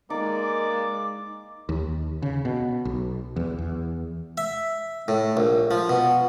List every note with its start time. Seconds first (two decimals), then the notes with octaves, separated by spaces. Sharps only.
0.10 G#3 A#3 D#4 A#4 D5 D6
1.69 D#2
2.22 C#3
2.45 B2
2.85 B1
3.36 E2
3.58 E2
4.38 E5
5.08 A2
5.37 A#1
5.71 F3
5.89 B2